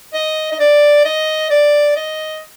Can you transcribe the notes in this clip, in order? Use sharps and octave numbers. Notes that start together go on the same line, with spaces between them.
D#5
D#5
D5
D#5
D5
D#5